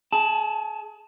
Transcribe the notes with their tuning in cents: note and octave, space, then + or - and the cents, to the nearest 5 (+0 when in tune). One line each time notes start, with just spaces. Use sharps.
G#4 +30 A5 +0